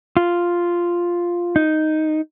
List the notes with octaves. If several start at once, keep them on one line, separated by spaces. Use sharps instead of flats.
F4
D#4